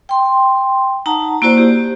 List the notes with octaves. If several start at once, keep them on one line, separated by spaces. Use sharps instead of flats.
G5 C6
D#4 F#5 A5 A#5
A#3 E4 F#4 C5 D5
G4